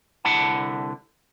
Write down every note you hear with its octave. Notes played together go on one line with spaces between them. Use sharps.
C2 D3 E4 F#5 A5